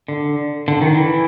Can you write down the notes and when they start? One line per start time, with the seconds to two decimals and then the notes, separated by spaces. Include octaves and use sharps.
0.08 D3
0.68 D3
0.81 D#3
0.95 E3